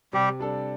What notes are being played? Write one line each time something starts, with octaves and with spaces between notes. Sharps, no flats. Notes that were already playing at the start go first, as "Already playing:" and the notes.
C3 G3 G4
G3 D4 A4